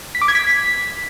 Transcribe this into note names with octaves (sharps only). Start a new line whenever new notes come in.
B6
D6
G#6
B6